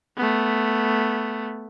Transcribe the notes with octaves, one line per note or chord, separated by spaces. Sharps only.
A3 B3